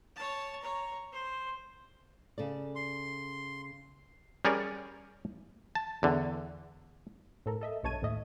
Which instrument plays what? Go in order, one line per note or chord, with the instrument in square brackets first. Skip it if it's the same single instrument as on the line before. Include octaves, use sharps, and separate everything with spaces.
[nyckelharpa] C#5 A5
C#5 A#5
C5
[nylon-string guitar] C#3 A4 D5
[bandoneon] C6
[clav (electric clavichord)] G3 C#4 G#4 A#4 C#5 D5
A5
E2 D3
[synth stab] A2 A4 A#4
A4 D#5 E5
B1 G2 C#5 A5 G#6 D#7
D#2 A2 D#5 E5